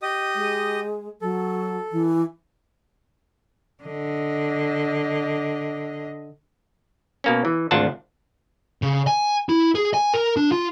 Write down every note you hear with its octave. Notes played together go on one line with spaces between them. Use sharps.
G4 D#5 D#6
G#3
F#3 A4
E3
D3 D#5
B2 A#3 C#4
E3
G#1 D2 D4 F4 F#5 A5
C#3
G#5
E4
G#4
G#5
A#4
D4
F4